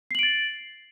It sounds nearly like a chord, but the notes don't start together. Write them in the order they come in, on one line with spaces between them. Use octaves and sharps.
C7 F#7 D7 A6